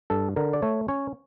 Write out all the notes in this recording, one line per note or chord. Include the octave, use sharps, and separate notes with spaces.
G2 A4
D3 A#4
D5
A3 C#5
C#4 C#5